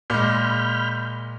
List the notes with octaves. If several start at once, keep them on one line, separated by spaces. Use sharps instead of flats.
A#2 G#3 B5 F6 G6